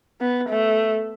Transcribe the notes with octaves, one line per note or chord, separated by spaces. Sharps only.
B3
A3